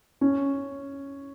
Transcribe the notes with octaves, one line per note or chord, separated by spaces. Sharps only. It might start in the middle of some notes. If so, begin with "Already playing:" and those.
C#4